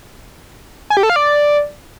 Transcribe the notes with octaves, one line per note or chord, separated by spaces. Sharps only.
G#5
G4
A4
F5
D5